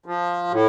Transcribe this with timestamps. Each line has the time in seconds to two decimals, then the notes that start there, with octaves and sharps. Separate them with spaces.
0.06 F3
0.51 A2